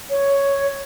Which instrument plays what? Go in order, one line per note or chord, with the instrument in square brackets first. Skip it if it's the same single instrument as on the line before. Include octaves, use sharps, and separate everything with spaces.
[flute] C#5